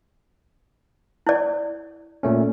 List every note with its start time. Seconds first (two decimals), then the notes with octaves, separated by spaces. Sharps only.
1.27 E4 D5
2.23 A#2 A3 C#4